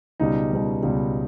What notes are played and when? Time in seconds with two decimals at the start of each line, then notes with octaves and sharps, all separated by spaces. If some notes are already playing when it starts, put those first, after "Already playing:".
0.20 C#2 B2 G3 D#4
0.51 C#2 B2 G3
0.83 C#2 B2 G3